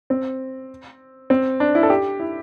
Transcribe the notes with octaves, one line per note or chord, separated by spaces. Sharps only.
C4
C4
D4
E4
A4
G4
E4